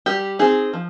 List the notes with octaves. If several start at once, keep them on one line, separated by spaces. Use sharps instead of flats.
G3 G4
C4 D#4 G#4
F3